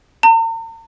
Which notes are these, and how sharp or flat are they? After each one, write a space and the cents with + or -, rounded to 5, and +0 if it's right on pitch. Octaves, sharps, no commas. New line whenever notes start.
A#5 -45